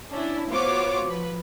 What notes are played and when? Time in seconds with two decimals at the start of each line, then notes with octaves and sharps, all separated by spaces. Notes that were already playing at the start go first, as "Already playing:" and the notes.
0.10 C#4 D4 E4
0.49 B3 F4 F#4 C5 C#5 D6
1.04 F3 B4